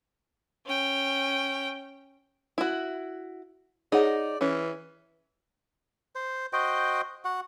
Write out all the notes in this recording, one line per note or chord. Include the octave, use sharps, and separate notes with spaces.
C#4 G5
E4 F#4
D#4 G#4 C#5 D5 F#5
E3 C#4
C5
F#4 C5 D#5 G5
F#4 F#5